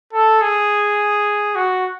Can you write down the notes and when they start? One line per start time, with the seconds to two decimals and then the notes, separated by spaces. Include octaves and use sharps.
0.13 A4
0.41 G#4
1.55 F#4